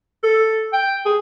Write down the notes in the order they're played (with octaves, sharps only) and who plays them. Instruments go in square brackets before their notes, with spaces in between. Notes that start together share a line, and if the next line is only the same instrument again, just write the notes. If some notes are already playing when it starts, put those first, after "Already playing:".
[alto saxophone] A4
G5
G#4